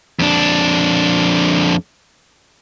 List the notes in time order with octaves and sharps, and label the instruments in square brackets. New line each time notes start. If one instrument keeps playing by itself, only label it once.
[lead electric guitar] F2 D4